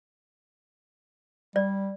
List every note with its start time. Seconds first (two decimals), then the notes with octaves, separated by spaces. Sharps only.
1.56 G3 D5